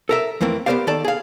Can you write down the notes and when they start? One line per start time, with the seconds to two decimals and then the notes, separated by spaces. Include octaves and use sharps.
0.09 A4 A#4 E5
0.41 F2 E3 A3 A#3 C4
0.66 B3 G4 A#4 C5 D5 F5
0.87 D#3 A4 D5 A5
1.05 G#4 F5